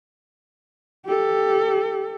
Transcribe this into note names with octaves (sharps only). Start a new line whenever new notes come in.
G4 A4